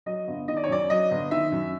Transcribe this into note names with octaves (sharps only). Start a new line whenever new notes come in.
F#3 D#5
G1
D#3 D#5
D5
C#5
F#2 D5
F#3 D#5
G1
D#3 E5
F#2